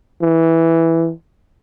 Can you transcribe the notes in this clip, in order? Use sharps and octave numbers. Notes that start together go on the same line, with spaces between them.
E3